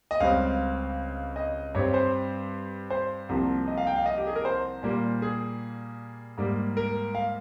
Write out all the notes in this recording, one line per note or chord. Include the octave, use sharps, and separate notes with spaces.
D#5
C#2 C#3 G3 C4 F5
D#5
G2 G3 C4 C#5
C5
C5
C2 C3 F3 A#3
D#5
F5
G5
F5
D#5
G4
G#4
A#4
C5
A#2 G3 A#3
G#4
G#2 G3 A#3
A#4
F5